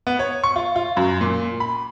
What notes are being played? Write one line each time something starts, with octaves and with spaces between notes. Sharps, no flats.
B3
C#5
C#6
F4
F4
F#2
A#2
B5